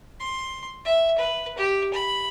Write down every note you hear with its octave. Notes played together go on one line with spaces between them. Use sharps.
C6
E5
B4
G4
B5